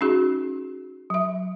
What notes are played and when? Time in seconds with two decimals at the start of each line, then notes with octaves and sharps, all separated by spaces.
0.01 C#4 D#4 F#4 G#4
1.10 F#3 E5